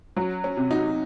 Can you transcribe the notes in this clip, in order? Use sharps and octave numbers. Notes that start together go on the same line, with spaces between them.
F#3 C#4
C#4
C3
D#4 F#4